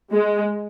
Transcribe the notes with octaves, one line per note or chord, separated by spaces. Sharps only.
G#3